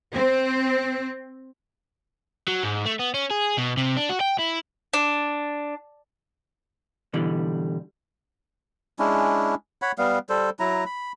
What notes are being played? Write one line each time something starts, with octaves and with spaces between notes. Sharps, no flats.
C4
F#3
G#2
A3
B3
C#4
G#4
B2
C3
D4
F#4
G5
E4
D4
B2 D3 E3 G3
G#3 C#4 D4 E4
C#5 F#5 B5
G3 B3 F5
G3 A4 C5
F#3 E4 A#5
B5